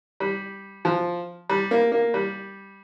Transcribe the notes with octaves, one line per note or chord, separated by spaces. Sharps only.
G3
F3
G3
A#3
A#3
G3